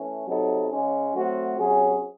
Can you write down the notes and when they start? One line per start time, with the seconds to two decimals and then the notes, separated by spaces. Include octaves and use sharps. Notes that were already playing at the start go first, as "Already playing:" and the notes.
Already playing: E3 A3 C#4
0.27 C3 F#3 C4 D#4 A4
0.70 C#3 G#3 C#4
1.14 F#3 A3 C4 F#4
1.57 C3 F#3 C#4 G#4